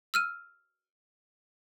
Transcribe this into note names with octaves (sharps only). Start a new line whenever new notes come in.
E6 F6 D#7